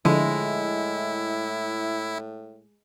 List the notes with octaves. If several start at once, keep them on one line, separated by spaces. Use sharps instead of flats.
A2 D3 F3 G#3 E4